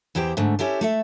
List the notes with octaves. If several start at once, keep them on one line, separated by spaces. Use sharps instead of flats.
E2 E4 G4 C5 G5
G#2 D3 A3
C#4 E4 G4 A4
A3 A4 E5